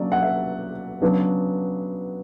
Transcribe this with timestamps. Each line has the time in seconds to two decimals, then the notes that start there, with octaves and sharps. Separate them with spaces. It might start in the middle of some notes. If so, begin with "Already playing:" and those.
Already playing: C#3 F#3 A#3 D4 D5
0.12 F#5
0.22 E5
1.02 C#3 F#3 B3 D4